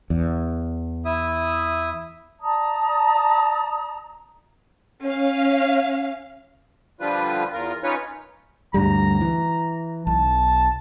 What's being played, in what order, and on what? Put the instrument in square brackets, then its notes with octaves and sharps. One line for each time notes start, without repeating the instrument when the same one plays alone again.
[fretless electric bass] E2
[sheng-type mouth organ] E4 E5 D#6
[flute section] D5 A5 A#5 D#6
[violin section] C#4 F5
[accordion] D3 F3 G3 F4 B4
E2 F4 A#4
C#4 D#4 F4 B4 C#5
[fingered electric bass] D2 G2 G3 [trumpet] A#5
[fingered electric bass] E3
[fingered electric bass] B1 [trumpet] A5